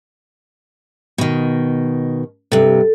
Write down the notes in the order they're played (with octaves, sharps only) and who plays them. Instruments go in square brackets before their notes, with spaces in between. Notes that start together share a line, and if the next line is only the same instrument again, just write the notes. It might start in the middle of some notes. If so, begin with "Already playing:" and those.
[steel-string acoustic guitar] B2 D#3
[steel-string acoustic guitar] G2 C3 [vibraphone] A4